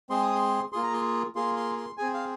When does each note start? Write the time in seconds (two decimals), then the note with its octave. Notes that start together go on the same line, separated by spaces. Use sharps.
0.10 G#3 C4 G#4 C6
0.22 D#6
0.35 C6
0.73 A#3 F4 G#4 C6
0.83 A#5
0.93 C6
1.35 A#3 F4 G#4 C6
1.56 C6
1.77 C6
1.97 C4 G#4 G#5
2.14 F5